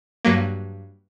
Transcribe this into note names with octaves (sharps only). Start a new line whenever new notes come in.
G2 F#3 A#3